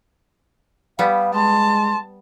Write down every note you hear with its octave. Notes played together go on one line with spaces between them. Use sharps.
G3 B3 F5
G#3 A5 C6